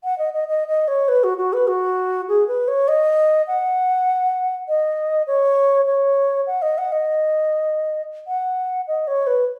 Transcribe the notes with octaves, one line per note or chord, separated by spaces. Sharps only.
F#5
D#5
D#5
D#5
D#5
C#5
B4
F#4
F#4
B4
F#4
G#4
B4
C#5
D#5
F#5
D#5
C#5
C#5
F#5
D#5
F#5
D#5
F#5
D#5
C#5
B4